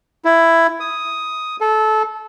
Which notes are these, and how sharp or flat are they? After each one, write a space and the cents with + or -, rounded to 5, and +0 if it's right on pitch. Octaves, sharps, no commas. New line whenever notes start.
E4 +10
D#6 +5
A4 -20